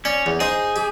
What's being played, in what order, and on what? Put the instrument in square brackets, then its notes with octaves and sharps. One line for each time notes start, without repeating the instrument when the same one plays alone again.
[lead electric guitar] C#4 [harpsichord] D5
[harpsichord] E2
[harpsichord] D#4 C5 [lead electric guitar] G#4
[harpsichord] G4